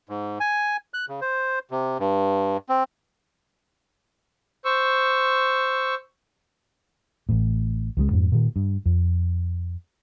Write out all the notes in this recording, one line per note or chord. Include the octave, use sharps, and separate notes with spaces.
G#2
G#5
F#6
C#3
C5
C3
G2
C4
C5 C#6 E6
A1 A2
C#2 C#3 F3 G#3
F2 G#2
A#2 D#3
G2
F2